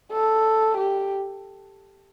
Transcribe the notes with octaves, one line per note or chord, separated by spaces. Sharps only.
A4
G4